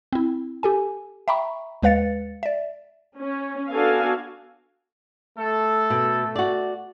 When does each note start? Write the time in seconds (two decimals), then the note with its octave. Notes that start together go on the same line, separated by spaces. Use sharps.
0.13 C4 E4
0.63 G4 A4 G#5
1.28 E5 G5 A#5 B5 C#6
1.83 D#2 G#3 B4 F5 A6 C#7
2.43 D5 E5
3.19 C#4
3.71 B3 D4 F#4 A4 F5 G#5
5.38 A3 A4
5.90 B2
6.36 F#4 D5